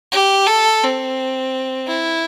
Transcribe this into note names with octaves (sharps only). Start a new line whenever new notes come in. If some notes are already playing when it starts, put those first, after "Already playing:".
G4
A4
C4
E4